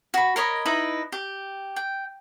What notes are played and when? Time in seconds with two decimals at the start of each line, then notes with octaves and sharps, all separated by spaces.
0.14 F#4 B5
0.36 A#4 C#5 D#5 B5
0.66 D#4 E4 B4 D#5
1.12 G4
1.76 G5